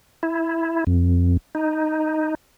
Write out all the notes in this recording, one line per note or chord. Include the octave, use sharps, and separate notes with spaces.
E4
F2
D#4